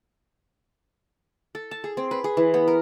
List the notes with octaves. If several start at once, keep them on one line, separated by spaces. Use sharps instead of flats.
A4
A5
G#4
C4
B4
G#4
E3
B3
A#4